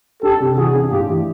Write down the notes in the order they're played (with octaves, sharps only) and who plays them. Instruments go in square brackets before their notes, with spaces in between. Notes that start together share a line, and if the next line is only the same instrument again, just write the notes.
[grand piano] D4 [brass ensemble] G4 A4
[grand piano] C3
[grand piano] E3 [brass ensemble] F#4 G#4
[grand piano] D4
[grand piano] A2 [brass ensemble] F4 G4
[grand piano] E3